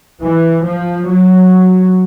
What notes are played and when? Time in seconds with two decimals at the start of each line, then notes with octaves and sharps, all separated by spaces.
0.21 E3
0.65 F3
1.08 F#3